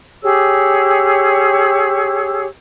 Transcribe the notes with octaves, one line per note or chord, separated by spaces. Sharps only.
G4 G#4 C#5 E6